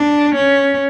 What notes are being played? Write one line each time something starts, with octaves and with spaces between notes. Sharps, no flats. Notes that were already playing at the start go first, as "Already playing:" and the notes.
Already playing: D4
C#4